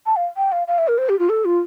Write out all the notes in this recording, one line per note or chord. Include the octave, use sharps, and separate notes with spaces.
A5
F5
G5
F5
F5
E5
A#4
C5
G4
F4
A4
F4